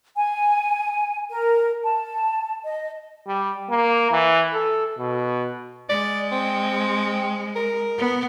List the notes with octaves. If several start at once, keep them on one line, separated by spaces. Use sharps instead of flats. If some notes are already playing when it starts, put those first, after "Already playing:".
G#5
A#4
A5
D#5
G3
A#3
E3
A4
B2
G#3 D5
C4
A#4
B3